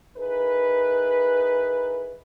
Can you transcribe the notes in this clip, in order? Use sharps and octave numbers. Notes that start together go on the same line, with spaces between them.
D#4 E4 G#4 A#4 B4